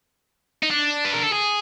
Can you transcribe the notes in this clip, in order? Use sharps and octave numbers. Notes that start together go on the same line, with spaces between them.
D#4
D4
B4
A#4
A4
G#4